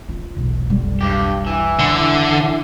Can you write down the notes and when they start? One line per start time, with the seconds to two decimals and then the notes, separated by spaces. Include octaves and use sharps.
0.09 F4
0.36 E1 B1
0.70 F2 G3
1.01 G2 G4
1.47 E3
1.79 D3